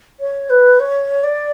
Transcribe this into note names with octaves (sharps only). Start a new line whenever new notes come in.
C#5
B4
C#5
D5